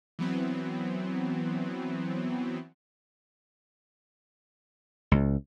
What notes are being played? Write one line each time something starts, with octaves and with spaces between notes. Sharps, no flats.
E3 F#3 B3 C4
C#2